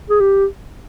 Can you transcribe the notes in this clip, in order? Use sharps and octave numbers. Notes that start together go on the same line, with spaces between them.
G#4
G4